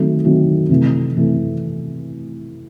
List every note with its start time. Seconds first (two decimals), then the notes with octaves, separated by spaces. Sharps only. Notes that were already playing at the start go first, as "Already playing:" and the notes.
Already playing: D#3 F#3 A3 C4
0.25 D#3 F#3 A3 C4
0.69 C3 E3 A3
1.15 C3 E3 A3